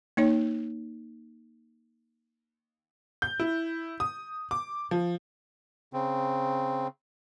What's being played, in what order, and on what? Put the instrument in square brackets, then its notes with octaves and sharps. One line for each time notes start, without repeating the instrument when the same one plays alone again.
[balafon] A#3 D#4 C#5
[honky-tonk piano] G6
E4
D#6
D6
F3
[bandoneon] C#3 C4